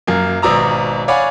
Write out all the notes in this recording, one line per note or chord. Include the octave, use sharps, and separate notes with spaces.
F#2 A#3
G#1 B2 D5 A#5 E6
C#5 D5 F5 F#5 G#5 B5